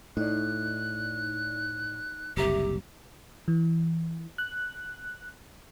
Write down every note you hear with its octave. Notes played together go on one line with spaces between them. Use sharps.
A2 D#4 D5 F#6
F#1 C2 G4 E5 A#5 E6
E3
F#6